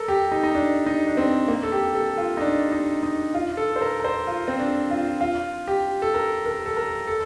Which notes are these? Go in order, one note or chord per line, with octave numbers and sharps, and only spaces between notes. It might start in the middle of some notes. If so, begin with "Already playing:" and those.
Already playing: A4 A#4
G4
D#4
D#4
D4
D#4
D4
C4
A#3
A4
G4
A4
F4
D#4
D4
D#4
D#4
F4
A4
C5
A#4
A#4
C5
F4
C4
D4
F4
F4
G4
A4
A#4
A#4
A4
A#4
A4